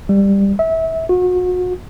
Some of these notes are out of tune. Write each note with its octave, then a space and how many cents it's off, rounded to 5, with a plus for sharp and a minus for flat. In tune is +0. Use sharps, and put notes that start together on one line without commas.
G3 +15
E5 -25
F#4 -35